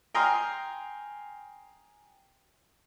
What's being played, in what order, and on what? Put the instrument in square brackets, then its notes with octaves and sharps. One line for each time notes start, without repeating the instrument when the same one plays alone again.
[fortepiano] G5 G#5 A#5 C6 D#6 F6